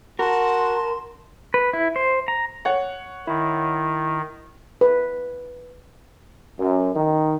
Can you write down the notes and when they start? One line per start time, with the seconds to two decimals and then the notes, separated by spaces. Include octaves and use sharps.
0.19 F#4 A#4 A5 C6
1.54 B4
1.73 E4
1.96 C5
2.28 A#5
2.65 C#5 F#5
3.27 D#3 E4
4.81 B4
6.59 F#2
6.96 D#3